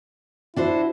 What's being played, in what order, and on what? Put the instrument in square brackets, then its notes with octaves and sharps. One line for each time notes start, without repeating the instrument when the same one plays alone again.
[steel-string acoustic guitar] D4 F#4 C5 [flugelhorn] E4